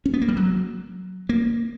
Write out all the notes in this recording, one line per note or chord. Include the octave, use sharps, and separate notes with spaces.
C#4
B3
A#3
G3
F#3
A#3